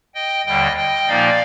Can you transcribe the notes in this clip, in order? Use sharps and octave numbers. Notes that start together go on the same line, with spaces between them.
D#5 G5
D#2 D3 G3 D#5 G5
D#5 G5
A#2 F3 A#3 D#4 D5 F5